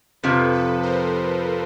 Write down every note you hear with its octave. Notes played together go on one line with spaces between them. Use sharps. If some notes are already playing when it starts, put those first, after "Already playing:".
F2 C3 F3 A4 B4
A4 B4
A#4 C5